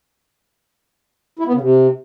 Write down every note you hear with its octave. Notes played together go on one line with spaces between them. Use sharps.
E4
B3
C#3
C3